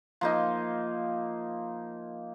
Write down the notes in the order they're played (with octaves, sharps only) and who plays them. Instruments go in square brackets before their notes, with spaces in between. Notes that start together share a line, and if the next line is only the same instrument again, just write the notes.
[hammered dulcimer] F3 A#3 D#4